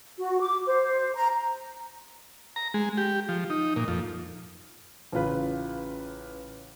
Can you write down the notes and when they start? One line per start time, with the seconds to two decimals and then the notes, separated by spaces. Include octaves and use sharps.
0.19 F#4
0.41 D6
0.67 C5
1.15 A#5
2.56 A#5
2.74 G#3
2.97 G4
3.29 F3
3.50 D#4
3.76 A#2
3.88 F2
5.12 A1 C#3 F4 B4